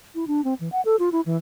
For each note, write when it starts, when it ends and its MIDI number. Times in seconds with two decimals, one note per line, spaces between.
0.15 0.27 64
0.27 0.44 62
0.44 0.54 60
0.60 0.69 52
0.72 0.81 78
0.85 0.96 69
0.99 1.09 65
1.12 1.21 64
1.26 1.37 52